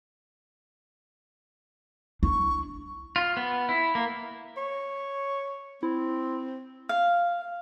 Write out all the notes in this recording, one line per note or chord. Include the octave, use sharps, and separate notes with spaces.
D4 E4 C#6
F4
B3
E4
A#3
C#5
C4 E4
F5